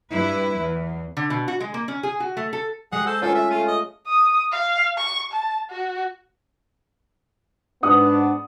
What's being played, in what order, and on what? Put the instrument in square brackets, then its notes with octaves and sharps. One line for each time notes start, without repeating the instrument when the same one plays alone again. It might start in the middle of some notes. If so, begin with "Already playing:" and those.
[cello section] G2 E4 B4
E2
[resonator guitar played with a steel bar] D3
B2
F#4
G#3
A#3
C#4
G#4
F#4
A3
A4
[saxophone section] F#2 G3 G#4 [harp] G#3 [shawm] F#5
[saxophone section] A4 [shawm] C5
[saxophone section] D2 D#3 B3 [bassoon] C#4 [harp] F4 [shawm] A4
[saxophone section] A3 [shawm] E5
[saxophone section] C#3 A3 [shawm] F4 [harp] D#7
[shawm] D#5
[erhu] D#6
F5
C#6
A5
F#4
[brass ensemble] G#2 B3 D4 [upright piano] F#5 D#6